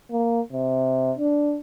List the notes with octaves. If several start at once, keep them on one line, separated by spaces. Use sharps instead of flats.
A#3
C3
D4